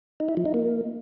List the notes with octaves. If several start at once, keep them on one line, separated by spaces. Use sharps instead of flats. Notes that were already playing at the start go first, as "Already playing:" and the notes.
D#4
E4
F3
D#4
A#3